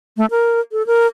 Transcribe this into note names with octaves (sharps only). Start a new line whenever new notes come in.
A3
A#4
A4
A#4